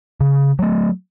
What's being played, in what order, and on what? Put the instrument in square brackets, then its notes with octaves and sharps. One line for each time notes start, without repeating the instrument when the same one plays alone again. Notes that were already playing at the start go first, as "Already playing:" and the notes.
[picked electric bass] C#3
F#3 A3